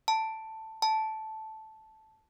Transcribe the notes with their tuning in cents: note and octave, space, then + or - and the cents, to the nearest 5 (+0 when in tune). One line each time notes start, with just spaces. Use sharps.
A5 +10
A5 -5